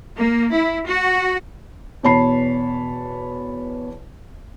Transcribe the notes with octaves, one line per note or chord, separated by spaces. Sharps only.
A#3
E4
F#4
E2 B2 C#5 A5 B5 C7